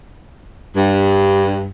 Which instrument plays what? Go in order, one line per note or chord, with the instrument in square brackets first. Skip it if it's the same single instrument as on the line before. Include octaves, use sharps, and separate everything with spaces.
[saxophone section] G2